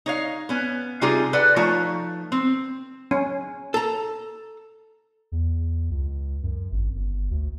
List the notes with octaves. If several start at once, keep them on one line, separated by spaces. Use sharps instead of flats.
D#4 C#5 F5
B3 C#4
C3 G3 D#4 F4 G4 G#4
A4 B4 D5 F#5
F3 A3 D#4 F4 C#5
C4
C#4
A4 A#5
E2
C#2
F#2
G#1
G1
D2